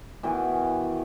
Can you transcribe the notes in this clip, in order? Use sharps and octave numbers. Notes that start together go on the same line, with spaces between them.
B2 D#3 E3